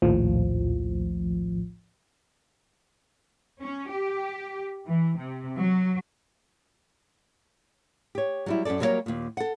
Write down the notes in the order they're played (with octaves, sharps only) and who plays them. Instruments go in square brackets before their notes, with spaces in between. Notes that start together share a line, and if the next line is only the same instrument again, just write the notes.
[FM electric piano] A#1 D#2 A2 F3
[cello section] C#4
G4
E3
C3
F#3
[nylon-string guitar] G4 C#5
F#3 G3 E4
F#2 C#4 G#4 A4 D5
F#3 G3 A#3 E4 A#4 C#5
D#2 A#2
A4 F#5